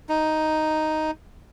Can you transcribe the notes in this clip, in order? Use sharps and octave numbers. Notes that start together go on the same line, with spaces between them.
D#4